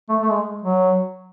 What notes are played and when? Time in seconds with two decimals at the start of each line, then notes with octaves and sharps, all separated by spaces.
0.09 A3
0.22 A3
0.31 G#3
0.62 F#3